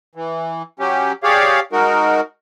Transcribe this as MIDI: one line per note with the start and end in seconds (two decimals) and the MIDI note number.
0.15 0.62 52
0.79 1.12 54
0.79 1.12 61
0.79 1.12 67
1.23 1.60 67
1.23 1.60 68
1.23 1.60 73
1.23 1.60 74
1.23 1.60 77
1.72 2.21 56
1.72 2.21 63
1.72 2.21 66
1.72 2.21 70